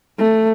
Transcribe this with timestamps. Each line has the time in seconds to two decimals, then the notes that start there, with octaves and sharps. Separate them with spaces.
0.18 A3